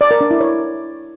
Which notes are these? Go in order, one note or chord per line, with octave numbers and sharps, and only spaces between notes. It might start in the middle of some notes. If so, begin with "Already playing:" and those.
D5
A#4
D4
E4
C#5